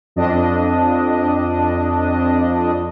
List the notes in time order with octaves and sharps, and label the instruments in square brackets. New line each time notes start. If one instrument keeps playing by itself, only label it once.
[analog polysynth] F2 D4 D#5